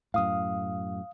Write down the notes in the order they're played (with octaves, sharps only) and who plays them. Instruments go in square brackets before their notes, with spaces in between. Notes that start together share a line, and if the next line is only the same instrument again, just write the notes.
[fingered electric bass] F#2 A2 [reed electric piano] F5 D#6